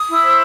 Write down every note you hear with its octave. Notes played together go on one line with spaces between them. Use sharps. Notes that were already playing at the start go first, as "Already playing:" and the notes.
Already playing: D#6
E4
C5